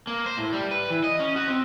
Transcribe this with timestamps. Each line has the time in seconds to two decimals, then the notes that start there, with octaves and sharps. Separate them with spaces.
0.07 A#3
0.26 C5
0.37 A2
0.53 G3
0.71 B4
0.90 E3
1.04 D#5
1.19 C#4
1.36 F#4
1.48 C4